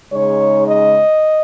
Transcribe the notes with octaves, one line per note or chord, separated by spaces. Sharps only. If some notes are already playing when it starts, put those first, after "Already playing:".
C#3 G#3 D#4 C#5
D#5